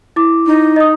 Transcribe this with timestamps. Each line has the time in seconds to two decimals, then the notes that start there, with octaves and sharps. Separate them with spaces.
0.16 E4 D6
0.46 D#4
0.76 D#5 D#6